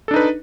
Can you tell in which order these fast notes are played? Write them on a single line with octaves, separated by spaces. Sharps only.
A4 D4 D#4 B4